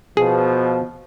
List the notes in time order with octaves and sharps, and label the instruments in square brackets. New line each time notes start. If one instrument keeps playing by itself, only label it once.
[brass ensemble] B2 F3 [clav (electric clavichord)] G#4